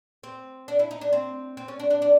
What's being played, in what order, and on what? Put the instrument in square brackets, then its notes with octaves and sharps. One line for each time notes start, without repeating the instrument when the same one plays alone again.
[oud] C4
D4
E4
D#4
D4
C4
C4
C#4
D4
D4
D4